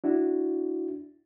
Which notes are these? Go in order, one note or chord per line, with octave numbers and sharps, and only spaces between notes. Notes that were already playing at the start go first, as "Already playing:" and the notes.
D4 E4 F#4